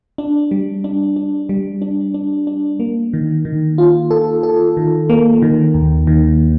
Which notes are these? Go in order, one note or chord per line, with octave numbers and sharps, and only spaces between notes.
D4
G3
D4
D4
G3
D4
D4
D4
A#3
D#3
D#3
F4
A4
A4
D#3
A#3
D#3
D#2
D#3